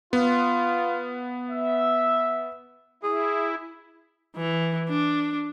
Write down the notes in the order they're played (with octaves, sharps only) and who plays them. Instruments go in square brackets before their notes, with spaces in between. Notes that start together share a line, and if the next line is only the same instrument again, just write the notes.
[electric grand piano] B3 [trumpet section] F4
[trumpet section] E5
[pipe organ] E4 [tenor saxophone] G#4
[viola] E3
D4